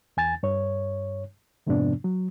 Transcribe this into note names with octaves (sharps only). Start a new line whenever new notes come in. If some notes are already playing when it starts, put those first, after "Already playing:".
E2 G#5 A6
G2 C#5
F2 G#2 C3 F3 B3 D4
F#3